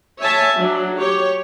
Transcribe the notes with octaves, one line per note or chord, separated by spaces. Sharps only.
C#5 E5 G#5 A5
F#3 D4
G4 C#5